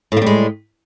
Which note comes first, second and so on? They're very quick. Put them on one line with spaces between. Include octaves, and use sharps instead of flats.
A2 A#3 G3 G#3